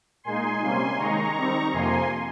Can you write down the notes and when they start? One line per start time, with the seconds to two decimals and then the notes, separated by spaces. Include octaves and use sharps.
0.24 A#2 G#3 D#4 G#5 C6
0.61 C3 G3 A#3 C#4 G#5 C6
0.98 D#3 G#3 D#4 A#5 C#6
1.35 D#3 G3 C4 D#4
1.72 F2 C3 F3 A#3 G#5 C6